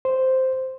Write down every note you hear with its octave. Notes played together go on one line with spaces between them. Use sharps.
C5